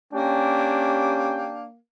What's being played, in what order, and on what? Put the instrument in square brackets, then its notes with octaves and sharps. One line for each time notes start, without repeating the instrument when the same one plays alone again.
[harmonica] A#3 [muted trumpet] C#4 [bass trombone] D4 [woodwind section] G4 G5